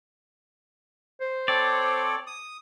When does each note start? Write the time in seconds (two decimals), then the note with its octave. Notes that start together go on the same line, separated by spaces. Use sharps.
1.21 C5
1.48 C4 A4 C#5 D5
2.27 D#6